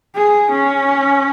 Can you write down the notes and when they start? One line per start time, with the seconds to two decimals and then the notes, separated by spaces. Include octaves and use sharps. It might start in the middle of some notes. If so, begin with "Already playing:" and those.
0.15 G#4
0.52 C#4